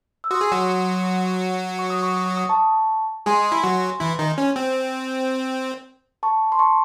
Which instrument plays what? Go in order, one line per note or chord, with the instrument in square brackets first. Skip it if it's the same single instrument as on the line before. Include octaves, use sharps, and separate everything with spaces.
[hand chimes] E6
[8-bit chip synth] F#4 [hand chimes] C6 D#6
[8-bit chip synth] G#4
F#3 F#4
[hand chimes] C#6
D#6
C#6
D#6
C#6
D#6
A5 C#6
[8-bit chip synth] G#3 G#4 [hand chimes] G#5 C6
[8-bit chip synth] E4
F#3 F#4
E3 E4
D#3 D#4
C#4
C4
[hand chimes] A5 C#6
C6
A5 C#6